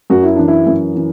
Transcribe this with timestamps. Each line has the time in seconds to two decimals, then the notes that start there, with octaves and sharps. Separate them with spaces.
0.10 F#2 F#4
0.23 E4
0.36 E3 D4
0.48 E4
0.67 F#2
0.95 E3